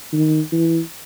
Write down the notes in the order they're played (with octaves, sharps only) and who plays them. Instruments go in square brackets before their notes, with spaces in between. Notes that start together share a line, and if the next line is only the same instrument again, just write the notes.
[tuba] D#3
E3